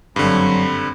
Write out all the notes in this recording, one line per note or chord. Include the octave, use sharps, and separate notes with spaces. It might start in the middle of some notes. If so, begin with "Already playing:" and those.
F#1 G2 D3 F#3 C4 B5